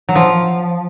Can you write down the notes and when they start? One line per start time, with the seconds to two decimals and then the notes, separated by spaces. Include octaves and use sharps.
0.09 F#3
0.15 F3